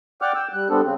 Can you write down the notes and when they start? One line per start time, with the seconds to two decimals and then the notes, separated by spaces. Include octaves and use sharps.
0.22 D5 F#5 G5 D6 F6
0.35 G5 E6
0.53 G3 F#6
0.70 G3 B3 C4 D4 A4
0.84 C#3 C4